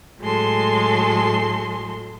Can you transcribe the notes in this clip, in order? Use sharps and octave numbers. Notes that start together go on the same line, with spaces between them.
A2 F#3 G#3 A4 C6